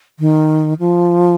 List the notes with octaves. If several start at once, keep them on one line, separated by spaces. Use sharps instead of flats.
D#3
F3